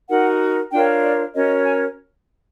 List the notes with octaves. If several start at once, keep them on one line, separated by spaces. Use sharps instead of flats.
D#4 F#4 A#4 F#5
D4 F4 A#4 C#5 G5
D5
C#4 F#4 A#4 C#5 D#5
G#5